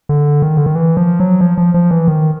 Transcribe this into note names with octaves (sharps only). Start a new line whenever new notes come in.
D3
D#3
D3
D#3
E3
F3
F#3
F3
F3
F3
E3
D#3